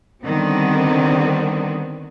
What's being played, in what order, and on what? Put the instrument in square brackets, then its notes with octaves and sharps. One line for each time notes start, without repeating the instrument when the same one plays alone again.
[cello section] D3 D#3 G3 B3 C4